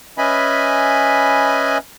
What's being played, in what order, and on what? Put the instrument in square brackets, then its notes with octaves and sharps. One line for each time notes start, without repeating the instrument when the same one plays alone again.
[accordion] C#4 B4 D#5 E5 G#5 B5